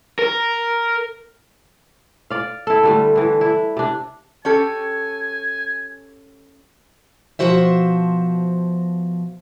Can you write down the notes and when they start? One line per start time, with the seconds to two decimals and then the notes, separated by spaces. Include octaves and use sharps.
0.19 A#4
2.30 D5 F5
2.67 E4 A4
2.83 D3 G3 A3
3.16 D3 E3
3.41 D4 E4
3.77 C3 D4
4.45 C#4 G4 A4 G#5
7.39 B2 D#3 F3 F#4 C5 E5